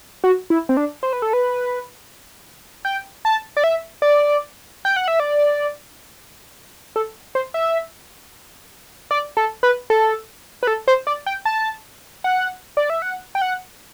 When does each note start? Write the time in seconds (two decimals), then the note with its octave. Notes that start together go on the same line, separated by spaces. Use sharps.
0.24 F#4
0.50 E4
0.69 C4
0.77 D4
1.03 C5
1.13 B4
1.22 A4
1.33 B4
2.85 G5
3.25 A5
3.57 D5
3.64 E5
4.02 D5
4.85 G5
4.96 F#5
5.08 E5
5.20 D5
6.96 A4
7.35 C5
7.54 E5
9.11 D5
9.37 A4
9.63 B4
9.90 A4
10.63 B4
10.67 A4
10.88 C5
11.07 D5
11.26 G5
11.45 A5
12.24 F#5
12.77 D5
12.90 E5
13.02 F#5
13.35 G5
13.42 F#5